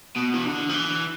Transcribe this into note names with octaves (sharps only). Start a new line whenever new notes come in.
B2
E3
D3
F3
E3